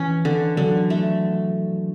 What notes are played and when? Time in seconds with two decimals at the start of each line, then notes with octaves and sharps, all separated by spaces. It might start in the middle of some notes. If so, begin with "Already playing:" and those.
Already playing: E3 C#4
0.25 D3
0.57 D3 F#3
0.90 A3